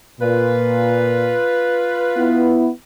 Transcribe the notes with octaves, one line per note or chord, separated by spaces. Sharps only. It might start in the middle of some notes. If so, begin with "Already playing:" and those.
A#2 F4 B4
B3 E4